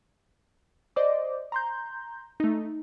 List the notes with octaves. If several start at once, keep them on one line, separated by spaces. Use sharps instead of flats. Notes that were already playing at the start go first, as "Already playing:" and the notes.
C5 D5 D#5 D6
A#5 C6 G6
A3 D#4